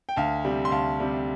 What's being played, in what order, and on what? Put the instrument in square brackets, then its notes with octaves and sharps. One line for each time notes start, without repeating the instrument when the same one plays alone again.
[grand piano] G5
D2 F5 A5
C3 G3
C6
D2 F5 A5
C3 G3